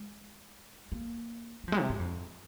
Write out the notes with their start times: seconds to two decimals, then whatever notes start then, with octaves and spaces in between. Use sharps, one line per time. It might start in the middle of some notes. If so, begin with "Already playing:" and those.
Already playing: G#3
0.92 A#3
1.64 A#3
1.68 F3
1.72 G#3
1.81 C3
1.90 G#2
2.00 F2